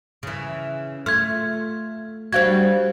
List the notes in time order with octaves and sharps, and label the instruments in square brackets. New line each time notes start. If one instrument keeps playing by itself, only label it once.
[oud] C#3 E3
[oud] A3 F4 [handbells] F6 G#6
[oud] G3 D4 F#4 [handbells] C5 F5 G#6